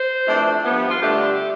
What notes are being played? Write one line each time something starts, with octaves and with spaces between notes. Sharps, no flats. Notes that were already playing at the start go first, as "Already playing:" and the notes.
Already playing: C5
F2 E3 A3 D4
G2 F3 B3
G4
F4
G2 D3 A3 D4 G4